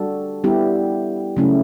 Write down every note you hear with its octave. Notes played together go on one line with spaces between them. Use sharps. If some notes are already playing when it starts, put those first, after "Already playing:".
Already playing: G3 D4 F#4 A4
G3 B3 E4 G4
C#3 F#3 A3 C#4 E4